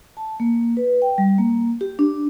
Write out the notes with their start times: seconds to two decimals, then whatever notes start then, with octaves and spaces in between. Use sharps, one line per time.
0.17 A5
0.40 A#3
0.77 B4
1.02 G5
1.18 G3
1.38 A#3
1.81 G4
1.99 D4